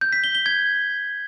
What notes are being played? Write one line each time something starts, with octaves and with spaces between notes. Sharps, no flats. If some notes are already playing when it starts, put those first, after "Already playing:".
G6
B6
G7
G7
G#6